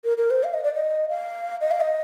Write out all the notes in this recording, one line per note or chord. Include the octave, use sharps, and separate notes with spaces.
A#4
A#4
C5
F5
D#5
D5
D#5
F5
D#5
F5
D#5